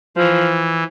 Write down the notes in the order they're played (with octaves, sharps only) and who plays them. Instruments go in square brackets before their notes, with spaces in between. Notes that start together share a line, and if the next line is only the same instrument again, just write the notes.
[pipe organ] E3 [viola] F3